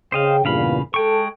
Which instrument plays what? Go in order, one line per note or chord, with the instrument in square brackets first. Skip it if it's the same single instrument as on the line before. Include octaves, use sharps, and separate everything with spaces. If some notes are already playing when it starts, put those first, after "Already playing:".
[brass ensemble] C#3 G5 [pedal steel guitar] C5 D#5 F5
[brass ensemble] E2 G2 A#2 [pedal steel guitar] C#3 F5 B5
[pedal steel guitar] G#3 G5 C#6 [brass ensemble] A4